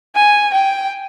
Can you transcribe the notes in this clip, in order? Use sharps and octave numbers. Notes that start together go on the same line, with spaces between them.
G#5
G5